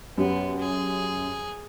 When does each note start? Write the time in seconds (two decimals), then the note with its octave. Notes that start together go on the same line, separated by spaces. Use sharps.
0.18 F#2 B3 G4
0.60 G#4